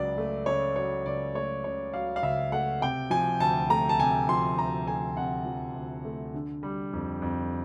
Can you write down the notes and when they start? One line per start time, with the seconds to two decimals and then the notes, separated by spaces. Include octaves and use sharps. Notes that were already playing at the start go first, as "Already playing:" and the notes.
Already playing: C#2 C#3 F#3 D5
0.18 A3
0.46 C#3 C#5
0.76 F#3 C#5
1.06 C#2 D5
1.35 A3 C#5
1.64 C#3 C#5
1.93 F#3 F5
2.16 F5
2.23 C#2 E5
2.52 A3 F#5
2.81 C3 G5
3.10 F3 G#5
3.40 D2 A5
3.70 A3 A#5
3.89 A5
3.99 C3 G#5
4.29 F3 C6
4.58 D2 A#5
4.87 A3 G#5
5.17 C3 F#5
5.46 F3
5.75 D2
6.05 A3
6.34 D3
6.63 G3
6.93 F2
7.22 F2